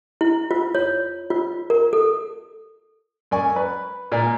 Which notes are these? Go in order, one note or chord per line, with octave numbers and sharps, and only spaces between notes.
E4
F4
C#5
F4
A#4
A4
F#2 D5 G#5 C#6
B4
A#2 A#4 D5 G#5